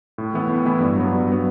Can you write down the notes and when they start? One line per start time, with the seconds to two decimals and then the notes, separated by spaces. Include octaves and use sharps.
0.18 A2
0.34 E3 B3 E4
0.49 A2
0.65 E3 B3 E4
0.80 G2
0.96 F#3 B3
1.12 G2
1.28 F#3 B3